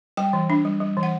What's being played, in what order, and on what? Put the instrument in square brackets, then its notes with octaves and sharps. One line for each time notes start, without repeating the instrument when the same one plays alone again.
[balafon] G3 G5
E3
D4
G3
G3
E3
F#5